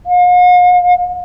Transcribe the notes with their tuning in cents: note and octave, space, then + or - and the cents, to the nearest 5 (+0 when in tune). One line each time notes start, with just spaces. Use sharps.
F5 +45